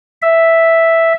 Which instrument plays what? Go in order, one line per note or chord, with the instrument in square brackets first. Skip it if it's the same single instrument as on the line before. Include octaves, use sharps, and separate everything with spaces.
[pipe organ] E5